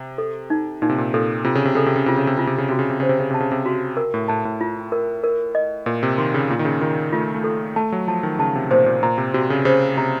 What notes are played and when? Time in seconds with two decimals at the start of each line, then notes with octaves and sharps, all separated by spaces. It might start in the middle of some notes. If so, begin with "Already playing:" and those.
Already playing: C3
0.18 A4
0.50 D#4
0.82 A#2 D#4
0.89 C3
0.98 A#2
1.14 A#2 A4
1.44 C3 F4
1.55 C#3
1.65 C3
1.75 C#3 A4
1.86 C3
1.96 C#3
2.06 C3 F4
2.17 C#3
2.27 C3
2.37 C#3 F4
2.47 C3
2.58 C#3
2.69 C3 F#4
2.79 C#3
2.90 C3
3.00 C#3 C5
3.09 C3
3.20 C#3
3.31 C3 A5
3.40 C#3
3.52 C3
3.66 F#4
3.97 A#4
4.14 A2
4.28 A2 A5
4.45 A2
4.61 F4
4.92 A#4
5.23 A#4
5.55 D#5
5.86 A#2 A#4
6.03 C3
6.18 D#3 C6
6.34 C#3
6.50 A#2 F4
6.59 D#3
6.65 C#3
6.81 D#3 F4
7.12 A3 F4
7.34 A3
7.44 A4
7.76 A3 A5
7.92 F#3
8.08 F3 A5
8.23 D#3
8.39 C#3 A5
8.55 C3
8.70 A#2 C5
8.86 A#2
9.03 A#2 A#5
9.18 C3
9.34 C3 F#4
9.50 C#3
9.65 C#3 C5
9.97 C3 A#5